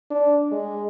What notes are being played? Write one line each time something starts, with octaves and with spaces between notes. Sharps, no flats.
D4
G#3